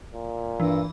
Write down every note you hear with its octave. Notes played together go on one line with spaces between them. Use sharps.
A#2
G2 E3